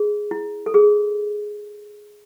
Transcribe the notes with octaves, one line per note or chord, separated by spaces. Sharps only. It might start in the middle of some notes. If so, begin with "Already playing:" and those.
Already playing: G#4
E4
A4
G#4